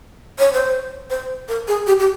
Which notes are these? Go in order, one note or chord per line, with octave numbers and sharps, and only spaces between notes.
C#5
C5
C5
A#4
G#4
G4
G4